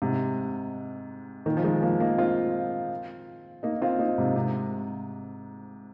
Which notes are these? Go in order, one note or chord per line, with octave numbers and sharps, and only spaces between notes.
G#2 C3
A#2 D#3
F3
D#3 G#3
F3 A#3
A#3 D#4
C4 F4
A#3 D#4
C4 F4
A#3 D#4
G#2 C3
G#2 C3